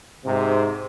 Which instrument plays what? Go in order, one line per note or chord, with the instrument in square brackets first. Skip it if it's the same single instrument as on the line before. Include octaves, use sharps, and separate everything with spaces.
[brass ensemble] G#2 C3